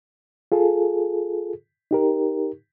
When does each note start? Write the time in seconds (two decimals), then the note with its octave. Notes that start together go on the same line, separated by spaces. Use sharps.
0.52 F4 G#4 A4
1.91 D#4 G4 A#4